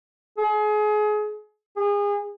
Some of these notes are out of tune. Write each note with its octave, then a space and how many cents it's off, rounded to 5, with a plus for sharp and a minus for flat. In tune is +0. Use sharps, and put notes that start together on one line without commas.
G#4 +30
G#4 -30